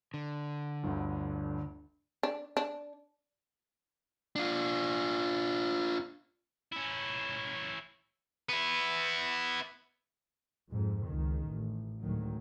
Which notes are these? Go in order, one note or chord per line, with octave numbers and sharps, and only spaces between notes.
D3
G1 D2
D4
D4
D4 F4
C#4 E4
B3 E4
F2 G#2
C#2 D#3
A1
A1 D2 G#2 D#3 F#3